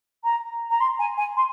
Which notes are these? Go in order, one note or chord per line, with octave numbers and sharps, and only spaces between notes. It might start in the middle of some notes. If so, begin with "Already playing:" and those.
A#5
A#5
C6
G#5
G#5
C6